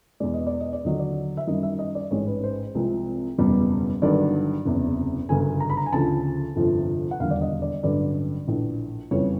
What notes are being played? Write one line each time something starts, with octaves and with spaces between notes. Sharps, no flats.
E2 B2 G#3 D5
D#5
D5
D#5
D5
D#2 D3 F#3 D#5
D5
E5
F#2 D#3 G3 D#5
E5
D#5
D5
A1 G#2 E3 G#3 C#5
B4
C5
C2 C3 F3 G#3
F#1 E2 B2 G3
G1 G2 D#3 F#3 D5
F#1 E2 C3
G1 F#2 C#3 G#5
A#5
B5
A#5
G#5
D2 C#3 F3 A5
G1 F2 C3 F3
F#5
E1 D#2 D3 G3 F5
D5
D#5
D5
A1 G2 D3 F#3 D5
A#1 A2 E3
F#1 F2 C#3 E3 G3 C#5